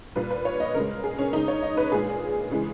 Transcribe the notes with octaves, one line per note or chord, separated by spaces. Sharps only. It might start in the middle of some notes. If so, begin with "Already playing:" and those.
A#2 G3 B4
B4
C#5
D#5
C#3 G#3 A#4
G#4
C#4
C#3 G#3 D#4
C#5
D#5
B4
A#2 G#3 G#4
C#3 E3 G#3